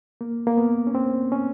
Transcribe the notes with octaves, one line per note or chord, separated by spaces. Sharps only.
A#3
A#3
B3
C#4
C4
C#4